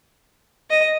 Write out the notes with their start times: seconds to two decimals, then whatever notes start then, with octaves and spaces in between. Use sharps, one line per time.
0.69 D#5